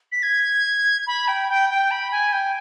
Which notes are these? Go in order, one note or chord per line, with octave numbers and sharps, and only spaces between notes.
B6
G#6
B5
G5
G5
G5
B5
G#5
G5